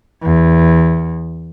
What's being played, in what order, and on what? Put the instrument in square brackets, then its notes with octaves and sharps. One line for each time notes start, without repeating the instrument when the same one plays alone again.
[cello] E2